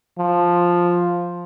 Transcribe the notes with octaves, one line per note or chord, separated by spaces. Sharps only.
F3